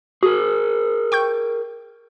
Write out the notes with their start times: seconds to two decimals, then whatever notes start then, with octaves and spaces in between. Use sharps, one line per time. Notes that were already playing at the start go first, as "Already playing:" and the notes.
0.23 F#4 G#4 A#4
1.12 G5 C#6 G6